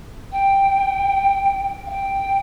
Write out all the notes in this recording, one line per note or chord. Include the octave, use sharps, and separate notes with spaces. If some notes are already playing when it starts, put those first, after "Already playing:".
G5
F5
G5